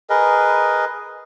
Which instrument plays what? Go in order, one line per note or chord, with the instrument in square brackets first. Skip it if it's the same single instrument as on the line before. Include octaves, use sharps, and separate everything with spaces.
[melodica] G#4 A#4 B4 D#5